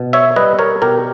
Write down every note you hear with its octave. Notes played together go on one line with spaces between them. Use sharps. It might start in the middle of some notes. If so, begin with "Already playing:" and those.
Already playing: B2
C#5 E5
G3 B4 D#5
A#4 C#5
B2 G4 A#4